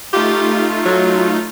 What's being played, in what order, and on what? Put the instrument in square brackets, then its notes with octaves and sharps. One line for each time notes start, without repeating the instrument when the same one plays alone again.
[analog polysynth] A3 D#4 F4 [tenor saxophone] G4
[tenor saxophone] F#3